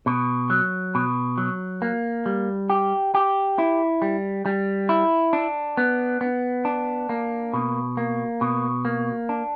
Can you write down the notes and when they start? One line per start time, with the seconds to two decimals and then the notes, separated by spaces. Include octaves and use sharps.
0.06 B2
0.50 F#3
0.95 B2
1.38 F#3
1.82 A#3
2.26 G3
2.70 G4
3.15 G4
3.58 E4
4.02 G3
4.46 G3
4.89 E4
5.33 D4
5.77 B3
6.21 B3
6.65 D4
7.09 A#3
7.53 B2
7.97 A#3
8.41 B2
8.85 A#3
9.29 D4